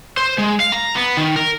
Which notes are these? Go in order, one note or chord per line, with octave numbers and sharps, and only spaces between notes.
C5
G#3
F5
A#5
B3
D#3
A#4